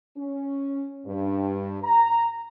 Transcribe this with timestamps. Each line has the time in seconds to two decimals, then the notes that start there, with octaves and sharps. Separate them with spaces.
0.17 C#4
1.06 G2
1.84 A#5